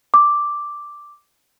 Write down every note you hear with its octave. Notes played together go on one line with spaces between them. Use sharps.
D6